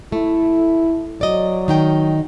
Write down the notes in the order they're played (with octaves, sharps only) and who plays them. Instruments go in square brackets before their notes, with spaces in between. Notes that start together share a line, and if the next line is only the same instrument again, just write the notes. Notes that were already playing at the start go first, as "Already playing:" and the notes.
[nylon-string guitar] A3 [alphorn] E4
[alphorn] F#3 [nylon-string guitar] D5 D#5
[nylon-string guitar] D#3 D#4 G5